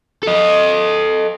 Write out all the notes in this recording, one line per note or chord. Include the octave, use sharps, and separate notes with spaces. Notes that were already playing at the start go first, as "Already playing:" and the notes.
A4 D#5